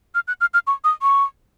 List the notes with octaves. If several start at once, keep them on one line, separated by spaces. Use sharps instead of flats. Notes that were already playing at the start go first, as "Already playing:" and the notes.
F6
F#6
F6
F6
C#6
D#6
C#6